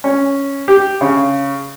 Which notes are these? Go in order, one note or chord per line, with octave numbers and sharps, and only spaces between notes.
C#4
G4
C#3